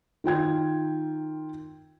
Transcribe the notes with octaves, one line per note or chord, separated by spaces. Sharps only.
D#3 F4 G5 G#6